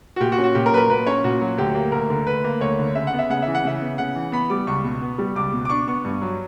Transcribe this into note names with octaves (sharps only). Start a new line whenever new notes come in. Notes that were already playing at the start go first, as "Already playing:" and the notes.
F#4
A#2 G4
F#4
C#4
F#4
A#2 G4
A#4
F#3 B4
A#4
A#2 B4
C#4 C#5
A#2 F#4
F#3
D2 G4
A#3
D2 A#4
D3
D2 B4
A#3
D2 C#5
D3
C#3 E5
F#5
B3
E5
C#3 F#5
E3 E5
F#5
C#3 E5
B3
C#3 F#5
E3
B3 B5
G3 D6
C#2 C#6
B2
B3
G3
C#2 D6
B2
D6
D4 C#6
B3 C#6
G2
F#3